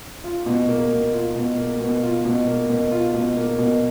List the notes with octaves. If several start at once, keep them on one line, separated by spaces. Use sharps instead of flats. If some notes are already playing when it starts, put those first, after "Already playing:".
F4
B2
A#3
B2
F4
B2
A#3
B2
F4
B2
A#3
B2
F4
B2
A#3
B2